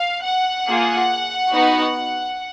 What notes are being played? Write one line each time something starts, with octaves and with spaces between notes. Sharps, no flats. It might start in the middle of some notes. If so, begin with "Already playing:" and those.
Already playing: F5
F#5
A#3 F4 G#4
B3 D#4 F#4